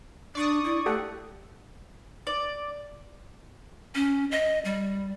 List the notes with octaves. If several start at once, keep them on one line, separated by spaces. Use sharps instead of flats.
D4 D5 C#6 D#6
E4
A3 G4 A4 F#5
D5
C#4
D#5
G3